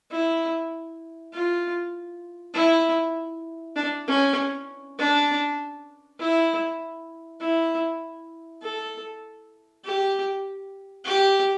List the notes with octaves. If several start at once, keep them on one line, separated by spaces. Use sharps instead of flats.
E4
F4
E4
D4
C#4
D4
E4
E4
A4
G4
G4